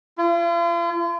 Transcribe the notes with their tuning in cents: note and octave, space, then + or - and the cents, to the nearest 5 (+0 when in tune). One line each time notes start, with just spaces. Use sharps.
F4 -40